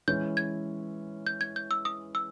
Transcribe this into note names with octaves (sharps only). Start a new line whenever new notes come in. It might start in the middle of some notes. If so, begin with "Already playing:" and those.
E3 G#3 C#4 E4 G6
G#6
G6
G#6
G6
E6
D#6
E6